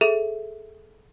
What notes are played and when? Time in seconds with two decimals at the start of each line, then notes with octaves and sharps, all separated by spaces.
0.01 G#4 A4 E5 F7